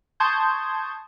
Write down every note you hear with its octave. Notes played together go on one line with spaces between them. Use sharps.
A5 C6 C#6 D#6 G6 G#6